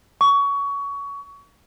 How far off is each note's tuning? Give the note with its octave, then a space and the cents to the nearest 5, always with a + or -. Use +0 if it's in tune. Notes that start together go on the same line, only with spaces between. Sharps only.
C#6 +25